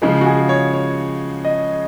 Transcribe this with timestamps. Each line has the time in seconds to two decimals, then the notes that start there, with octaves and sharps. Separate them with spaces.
0.02 C#3 F3 G#3
0.21 F#4
0.26 G#4
0.49 C#5
0.74 C#5
1.45 D#5